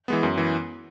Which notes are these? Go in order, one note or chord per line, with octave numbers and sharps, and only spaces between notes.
E3 G#3 B3
F#2
E3 B3